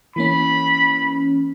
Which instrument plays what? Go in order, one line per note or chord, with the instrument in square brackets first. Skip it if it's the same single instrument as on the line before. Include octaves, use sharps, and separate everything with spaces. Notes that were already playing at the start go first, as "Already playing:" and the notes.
[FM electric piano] E3 A#3 C#4 [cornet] B5